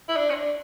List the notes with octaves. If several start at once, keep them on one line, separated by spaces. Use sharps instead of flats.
E4
D4
C#4
D4